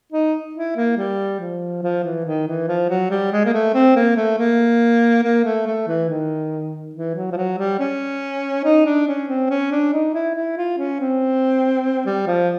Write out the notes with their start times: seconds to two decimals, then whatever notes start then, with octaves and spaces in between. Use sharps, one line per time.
0.12 D#4
0.54 E4
0.76 A#3
0.97 G3
1.40 F3
1.83 F3
2.03 E3
2.26 D#3
2.47 E3
2.68 F3
2.89 F#3
3.10 G3
3.32 G#3
3.45 A#3
3.54 A3
3.74 C4
3.96 A#3
4.16 A3
4.38 A#3
5.23 A#3
5.45 A3
5.66 A3
5.88 E3
6.09 D#3
6.95 E3
7.15 F#3
7.31 F3
7.37 F#3
7.58 G3
7.80 C#4
8.64 D#4
8.86 D4
9.08 C#4
9.28 C4
9.50 C#4
9.72 D4
9.93 D#4
10.14 E4
10.35 E4
10.57 F4
10.78 C#4
11.00 C4
12.06 G3
12.27 F3